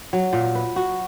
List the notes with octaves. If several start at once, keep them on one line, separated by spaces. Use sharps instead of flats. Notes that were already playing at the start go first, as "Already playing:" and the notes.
F#3
A#2
B4
F#4